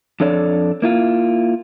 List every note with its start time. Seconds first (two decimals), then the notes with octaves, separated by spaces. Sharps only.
0.20 F2 D4 A4 C#5 D5
0.82 A#3 E4 F4